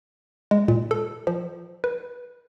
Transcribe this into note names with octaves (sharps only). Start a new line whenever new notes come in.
G#3
A#2
A4
F3
B4